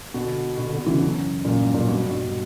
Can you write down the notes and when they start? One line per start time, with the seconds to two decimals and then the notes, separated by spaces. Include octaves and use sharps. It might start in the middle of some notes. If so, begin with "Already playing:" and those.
0.14 B2 D3
0.57 B2 D3
0.73 B2 D3
0.86 C#3 E3
1.02 F#2
1.45 F#2 A#2
1.60 G2
1.74 F#2 A#2
1.88 G2 B2
2.10 G2 B2